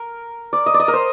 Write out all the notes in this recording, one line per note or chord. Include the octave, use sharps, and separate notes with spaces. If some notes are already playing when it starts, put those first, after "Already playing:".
Already playing: A#4
D5
D#5
D5
D#5
A#4
C5